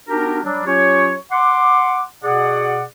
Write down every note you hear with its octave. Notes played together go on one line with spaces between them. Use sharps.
B3 D4 D#4 F#4 G4 A#4
F#3 G3 D4
F#3 C#4 F4 G4 C#5
F#5 C6 D6
B2 G#4 D5 F#5